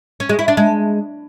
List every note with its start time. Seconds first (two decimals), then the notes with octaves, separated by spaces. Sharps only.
0.20 C#4
0.29 G#3
0.39 E4
0.48 D4
0.57 G#3